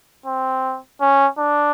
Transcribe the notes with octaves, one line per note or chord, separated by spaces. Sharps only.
C4
C#4
D4